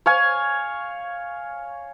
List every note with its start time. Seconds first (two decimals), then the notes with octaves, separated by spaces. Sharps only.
0.06 C#5 F5 G#5